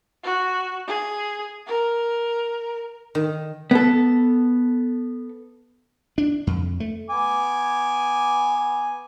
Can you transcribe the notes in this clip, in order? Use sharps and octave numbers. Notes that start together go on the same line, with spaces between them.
F#4
G#4
A#4
D#3
B3 A4
D4
F2
A3
B3 G#5 D6